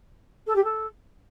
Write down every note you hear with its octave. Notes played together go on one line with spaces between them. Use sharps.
A4
G4
A4